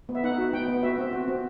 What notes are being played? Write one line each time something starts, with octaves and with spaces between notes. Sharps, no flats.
B3
E5
D#4 F#5
F#4
B3 G5
B3
F#4 E5
C4
F#4
C4